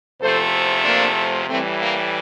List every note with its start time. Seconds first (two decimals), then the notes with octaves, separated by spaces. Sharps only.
0.21 E2 C3 F3 A3 A4 C5
0.85 A#3 D4
1.49 A2 E3 G3 A3 C4
1.82 A#3